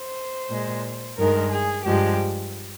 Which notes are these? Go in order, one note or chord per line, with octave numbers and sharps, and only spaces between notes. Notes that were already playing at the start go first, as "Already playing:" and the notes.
Already playing: C5
A#2 G#3
G2 D#3 G#3 A#4
G#4
G2 F3 G#3 G4